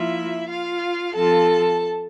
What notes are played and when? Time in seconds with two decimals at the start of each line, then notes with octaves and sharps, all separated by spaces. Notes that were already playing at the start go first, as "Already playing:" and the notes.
Already playing: F3 A#3 E4 F4 E5
0.49 F4 F5
1.15 F3 C4 F4 A4 A5